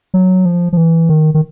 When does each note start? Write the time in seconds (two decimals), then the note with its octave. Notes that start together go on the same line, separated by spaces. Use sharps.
0.14 F#3
0.45 F3
0.73 F3
0.77 E3
1.09 D#3
1.34 D#3